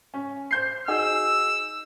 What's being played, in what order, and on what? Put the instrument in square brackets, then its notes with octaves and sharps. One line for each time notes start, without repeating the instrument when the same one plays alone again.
[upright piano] C#4
C5 G6 C7
[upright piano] D#4 F#4 G#4 [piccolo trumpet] E6